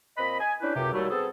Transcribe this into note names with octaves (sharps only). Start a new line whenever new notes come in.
A#2 C4 D#5 B5
D#5 G#5
C#4 D4 E4 G4 B4
C#2 F#2 C3 G4
D#2 F#3 G3 A3
B3 C4 G#4 A4